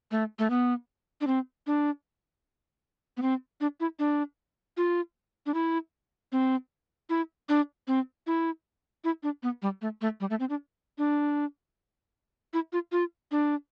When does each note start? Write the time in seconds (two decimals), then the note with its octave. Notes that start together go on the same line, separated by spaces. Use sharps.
0.11 A3
0.39 A3
0.50 B3
1.21 D4
1.27 C4
1.67 D4
3.17 B3
3.22 C4
3.61 D4
3.80 E4
3.99 D4
4.77 F4
5.46 D4
5.54 E4
6.32 C4
7.10 E4
7.49 D4
7.88 C4
8.27 E4
9.04 E4
9.23 D4
9.43 B3
9.62 G3
9.82 A3
10.01 A3
10.20 G3
10.30 A3
10.40 C4
10.50 D4
10.98 D4
12.53 E4
12.73 F4
12.92 F4
13.31 D4